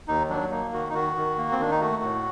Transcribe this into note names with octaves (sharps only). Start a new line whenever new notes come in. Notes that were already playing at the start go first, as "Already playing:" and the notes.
D#2 D#4
F#3 D4
A#3 D#4
D#3 F#4
D#4
D#3 F#4
D#3
A#3
C4
D#3 D4
D#4
A3 F#4
A2